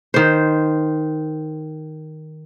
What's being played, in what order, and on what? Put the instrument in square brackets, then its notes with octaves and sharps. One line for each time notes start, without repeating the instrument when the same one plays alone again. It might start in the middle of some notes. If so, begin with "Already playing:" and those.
[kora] D#3 C5